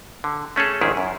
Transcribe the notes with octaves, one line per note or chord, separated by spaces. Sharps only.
D3
A3 C#4 G#4 A4
A#1 G#2 D#3 E4 G#4
F#2